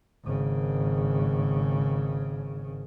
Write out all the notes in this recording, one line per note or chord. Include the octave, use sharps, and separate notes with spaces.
G#1 C#3